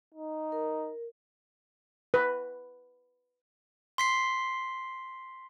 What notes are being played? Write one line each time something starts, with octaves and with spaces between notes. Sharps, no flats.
D#4
A#4
B4
C6 B6 C7